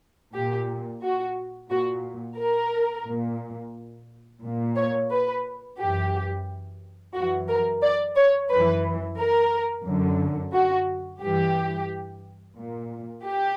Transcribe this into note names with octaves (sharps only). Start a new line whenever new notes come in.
A#2 G4
F#4
A#2 F#4
A#4
A#2
A#2
C#5
B4
F#2 E3 G4
F#2 E3 F#4
A#4
D5
C#5
F#2 E3 B4
A#4
F#2 D3
F#4
G2 E3 G4
A#2
G4